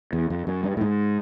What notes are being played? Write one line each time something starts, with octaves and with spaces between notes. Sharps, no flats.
E2
F2
F#2
G2
A2
G#2